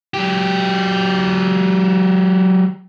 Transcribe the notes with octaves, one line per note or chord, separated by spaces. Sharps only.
F#3 G4